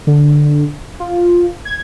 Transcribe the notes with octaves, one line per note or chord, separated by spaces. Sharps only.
D3
F4
G#6